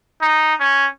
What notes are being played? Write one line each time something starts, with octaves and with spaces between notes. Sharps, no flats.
D#4
C#4